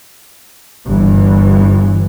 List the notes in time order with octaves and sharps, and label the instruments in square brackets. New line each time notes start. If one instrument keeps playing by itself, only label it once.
[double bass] G1 E3